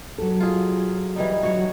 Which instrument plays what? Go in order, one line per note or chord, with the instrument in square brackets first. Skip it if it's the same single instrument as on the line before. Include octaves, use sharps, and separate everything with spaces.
[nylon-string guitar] F#3 A4
[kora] F4 G#4
E3 G3 D#4
[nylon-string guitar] D3 F#3 [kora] F#4 C#5